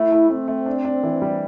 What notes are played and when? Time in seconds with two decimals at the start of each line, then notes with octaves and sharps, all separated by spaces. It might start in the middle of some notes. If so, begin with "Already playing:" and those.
Already playing: A3 E4
0.12 A3
0.30 A3 C4
0.48 A3
0.66 D4
0.85 D4
1.03 E3
1.22 G3